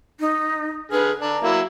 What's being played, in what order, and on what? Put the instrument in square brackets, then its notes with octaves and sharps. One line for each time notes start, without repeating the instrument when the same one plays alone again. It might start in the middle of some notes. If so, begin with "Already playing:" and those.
[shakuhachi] D#4
[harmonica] D3 G#4 F6 [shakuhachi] B4
[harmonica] D3 D4 [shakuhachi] A#5
[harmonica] F#3 A#3 E4